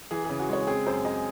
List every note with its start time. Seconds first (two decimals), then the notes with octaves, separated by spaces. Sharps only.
0.11 E3 G#4
0.25 C#3 G#4
0.39 F#4
0.49 G#3 C#5
0.67 C4 G#4
0.86 F#2 C5
1.04 F#2 D#5